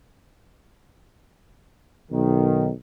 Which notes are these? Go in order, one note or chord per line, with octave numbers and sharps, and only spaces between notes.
B1 D#3